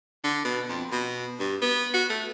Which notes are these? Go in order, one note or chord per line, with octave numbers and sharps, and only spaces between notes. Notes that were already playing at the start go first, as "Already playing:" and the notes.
D3
B2
F2
B2
G2
B3
F#4
A3